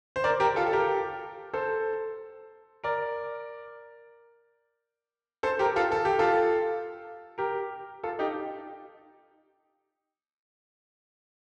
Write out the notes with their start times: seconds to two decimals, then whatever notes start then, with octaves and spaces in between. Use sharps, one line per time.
0.16 C5
0.24 A#4 D5
0.40 G4 A#4
0.56 F4 A4
0.67 A4
0.73 G4 A#4
1.54 A4 C5
2.84 A#4 D5
5.43 A4 C5
5.59 G4 A#4
5.76 F4 A4
5.92 A4
6.05 G4
6.19 F4 A4
7.38 G4 A#4
8.04 F4 A4
8.19 D#4 G4